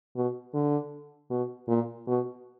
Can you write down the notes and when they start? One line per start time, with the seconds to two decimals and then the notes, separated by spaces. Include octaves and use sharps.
0.16 B2
0.54 D3
1.30 B2
1.68 A#2
2.07 B2